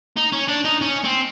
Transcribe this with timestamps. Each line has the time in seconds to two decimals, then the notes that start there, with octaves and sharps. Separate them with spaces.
0.17 D#4
0.33 C#4
0.48 D4
0.65 D#4
0.81 C#4
1.04 C4